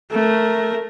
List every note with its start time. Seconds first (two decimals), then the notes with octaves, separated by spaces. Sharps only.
0.11 A3 A#4